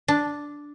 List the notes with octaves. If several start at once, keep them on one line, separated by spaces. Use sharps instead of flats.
D4